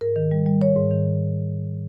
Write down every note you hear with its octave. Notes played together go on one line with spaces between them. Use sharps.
G#2 A#4
D#3
G3
G3
G3 C#5
G#2
D#3